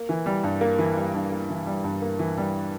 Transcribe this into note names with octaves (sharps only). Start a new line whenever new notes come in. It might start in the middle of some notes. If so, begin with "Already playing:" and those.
Already playing: A#3
E3
G3
G2
A#3
E3
G3
G2
A#3
E3
G3
G2
A#3
E3
G3